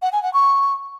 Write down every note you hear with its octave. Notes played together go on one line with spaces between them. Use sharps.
F#5
G#5
F#5
C#6